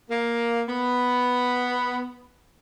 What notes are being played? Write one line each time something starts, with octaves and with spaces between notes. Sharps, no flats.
A#3
B3